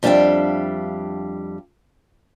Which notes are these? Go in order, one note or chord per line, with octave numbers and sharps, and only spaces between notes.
F2 G3 D4 E5 F5 G5